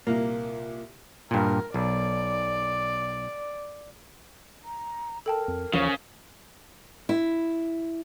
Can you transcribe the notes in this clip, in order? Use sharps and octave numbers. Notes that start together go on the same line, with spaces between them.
C2 A#2 A#3
G2 A#2 A#4
B1 D5
A#5
A4 A#4 G5 A5
F2
D#2 C#3 E3 F3 C5 F5 C7
E4